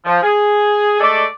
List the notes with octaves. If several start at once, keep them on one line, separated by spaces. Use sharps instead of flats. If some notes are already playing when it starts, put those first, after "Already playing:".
F3
G#4
G#3 A3 A4 D5